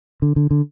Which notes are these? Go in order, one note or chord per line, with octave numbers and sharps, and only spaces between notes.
D3
D3
D3